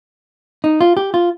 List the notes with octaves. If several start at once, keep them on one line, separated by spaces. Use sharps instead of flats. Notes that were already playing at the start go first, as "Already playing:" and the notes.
D#4
F4
G4
F4